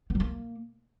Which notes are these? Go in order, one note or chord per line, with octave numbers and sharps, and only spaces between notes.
B3
F#3
A#3